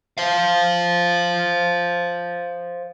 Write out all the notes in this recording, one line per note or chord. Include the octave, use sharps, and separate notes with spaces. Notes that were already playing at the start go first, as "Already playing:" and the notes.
C5 F5